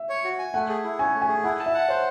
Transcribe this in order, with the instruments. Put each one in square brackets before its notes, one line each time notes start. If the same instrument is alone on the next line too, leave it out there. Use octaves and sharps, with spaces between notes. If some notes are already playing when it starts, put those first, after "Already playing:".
Already playing: [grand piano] E5
[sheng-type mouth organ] C#5
F#4
G#5
[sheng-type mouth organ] A3 [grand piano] F#5
[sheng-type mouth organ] G#4
E4
[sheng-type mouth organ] C#4 [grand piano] G#5
[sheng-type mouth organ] A3
[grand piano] G#5
[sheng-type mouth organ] G#4
[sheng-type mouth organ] E4 [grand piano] F#5
[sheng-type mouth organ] A5
[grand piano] E5
[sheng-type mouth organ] F#5
[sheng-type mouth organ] C5 [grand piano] C#5